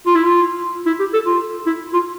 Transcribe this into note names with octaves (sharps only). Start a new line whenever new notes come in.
F4
E4
F4
E4
G4
A4
F4
E4
F4